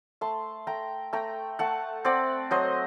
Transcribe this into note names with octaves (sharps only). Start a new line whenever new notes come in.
A3 A5 C6
A3 G5 A#5
A3 G5 A#5
A3 F#5 A5
C4 D5 F#5
F#3 C5 D#5